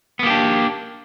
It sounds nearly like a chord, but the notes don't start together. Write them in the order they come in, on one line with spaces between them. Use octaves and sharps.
B3 A#3 G4 D4